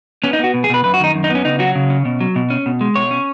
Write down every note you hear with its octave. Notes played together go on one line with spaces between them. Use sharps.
B3 C#4
D#4
B3 F#4
B2
G#4
B2 B4
F#2 B4
F#4
D#3 D#4
F#2
D#4
B3
C#4
C#3 D#4
F#3 F#4
C#3
C#4
B2
F#3
B2
C#4
B2
G#3
B2 C#5
C#4